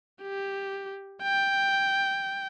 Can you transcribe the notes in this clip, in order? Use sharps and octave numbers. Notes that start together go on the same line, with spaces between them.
G4
G5